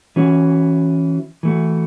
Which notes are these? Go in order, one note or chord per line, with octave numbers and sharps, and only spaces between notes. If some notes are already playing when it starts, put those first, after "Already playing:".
E3 C#4 F#4
E3 A3 F#4